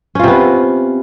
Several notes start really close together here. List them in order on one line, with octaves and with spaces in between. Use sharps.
C#4 F4 C3 B3